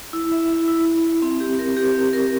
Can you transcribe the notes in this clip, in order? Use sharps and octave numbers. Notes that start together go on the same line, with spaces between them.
E4
E5
E4
E4
E4
E5
C4
G4
A#4
G4
C4
A#4